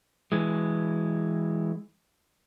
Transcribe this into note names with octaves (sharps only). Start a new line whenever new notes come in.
E3 G#3